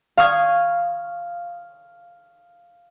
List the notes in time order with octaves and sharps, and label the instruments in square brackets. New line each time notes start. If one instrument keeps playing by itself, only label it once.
[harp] F5 C#6 D#6 F6 G#6 C7